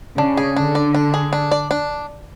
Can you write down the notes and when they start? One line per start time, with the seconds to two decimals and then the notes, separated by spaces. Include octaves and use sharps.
0.18 C#3 D4
0.37 G#4
0.56 D3 D4
0.75 D5
0.95 D4
1.14 G#4
1.33 D4
1.51 D5
1.71 D4